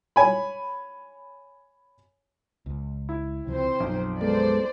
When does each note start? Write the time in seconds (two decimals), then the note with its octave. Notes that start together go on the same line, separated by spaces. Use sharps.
0.16 C#5 G#5 B5
2.66 C#2
3.09 E4
3.47 C#2 C3 F3 C4 C5
3.80 B1 F#2 F3
4.21 G#3 B3 A4 C5 D5